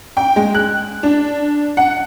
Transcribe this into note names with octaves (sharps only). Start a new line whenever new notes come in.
G5
G#3
F#6
D4
F#5